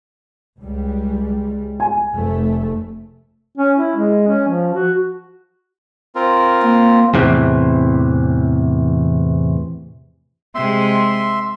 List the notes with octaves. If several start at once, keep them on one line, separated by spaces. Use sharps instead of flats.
C#2 G3 G#3
G#5
F1 A3
C#4
E4
G#3
C#4
F3
F#4
C4 F4 A#4
A#3
E2 A2 C3 E3
C3 G#3 E5 C6